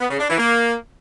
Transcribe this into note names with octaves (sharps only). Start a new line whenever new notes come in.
B3
C#3
D4
E3
A#3